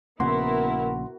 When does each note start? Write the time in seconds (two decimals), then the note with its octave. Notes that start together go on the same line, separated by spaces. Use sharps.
0.20 A#1 C#3 A#3 B3 E4 F#4 A#4 C6